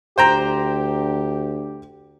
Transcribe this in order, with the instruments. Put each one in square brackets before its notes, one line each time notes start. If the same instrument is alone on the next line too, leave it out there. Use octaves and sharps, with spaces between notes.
[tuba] D2 [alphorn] G4 [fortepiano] C5 G5 A#5